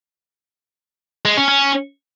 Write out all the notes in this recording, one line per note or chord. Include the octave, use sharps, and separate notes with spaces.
G#3
C#4
C#4